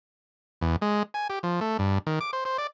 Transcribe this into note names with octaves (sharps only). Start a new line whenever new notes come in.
E2
G#3
G#5
G4
F3
A3
G2
D#3
D6
C5
C5
D5